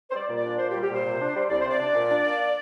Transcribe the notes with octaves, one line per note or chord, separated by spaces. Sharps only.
C5
G3 D5
A#2
D5
D4
A#2 C5
G4
G3
G4
A#2 C5
C3
D4
G3
C2 D5
C3 C5
D5
D4
A#2
D4
A#3